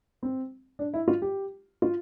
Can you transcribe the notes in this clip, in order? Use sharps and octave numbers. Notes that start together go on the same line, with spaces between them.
C4
D4
E4
F4
G4
F4